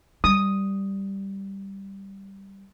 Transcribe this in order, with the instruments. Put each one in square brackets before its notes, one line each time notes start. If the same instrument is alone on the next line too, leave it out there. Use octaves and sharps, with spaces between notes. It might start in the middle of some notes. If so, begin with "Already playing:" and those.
[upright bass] G3 [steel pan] D#6